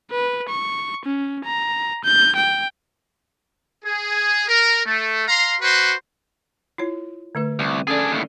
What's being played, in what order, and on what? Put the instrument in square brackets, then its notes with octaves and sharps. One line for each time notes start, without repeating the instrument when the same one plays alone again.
[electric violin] B4
C#6
C#4
A#5
G6
G5
[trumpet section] G#4
A#4
A3
F5 A#5 C6
F#4 B4 C5
[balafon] E4 F4 C#5
D3 A3 B4
[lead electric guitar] C2
[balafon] C#4 A4 D5 [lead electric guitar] D4 G#4
[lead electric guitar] D#2 A2